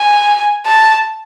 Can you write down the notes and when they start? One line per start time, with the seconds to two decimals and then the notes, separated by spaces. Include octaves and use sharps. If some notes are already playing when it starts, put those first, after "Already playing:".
Already playing: G#5
0.66 A5